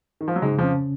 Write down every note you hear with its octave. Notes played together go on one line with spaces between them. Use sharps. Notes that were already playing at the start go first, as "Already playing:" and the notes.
D#3
F3
F#3
G#2 C#3 G#3
F2 F3
C#4